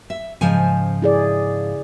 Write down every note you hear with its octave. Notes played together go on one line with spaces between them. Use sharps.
E5
G#2 C#3 F3 G#5
E4 G#4 D5